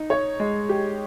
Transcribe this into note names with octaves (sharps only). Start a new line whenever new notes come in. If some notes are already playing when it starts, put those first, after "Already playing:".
Already playing: D#4
C#5
G#3
G4